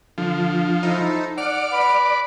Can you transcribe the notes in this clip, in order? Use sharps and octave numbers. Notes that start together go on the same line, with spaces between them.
D3 F3
D#4 E4 A4 C5
D5 F#5 F6
B4 B5